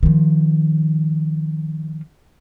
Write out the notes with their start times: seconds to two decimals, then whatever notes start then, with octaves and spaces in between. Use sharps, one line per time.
0.03 D#3 F3